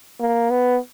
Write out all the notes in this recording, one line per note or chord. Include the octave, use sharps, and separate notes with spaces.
A#3
B3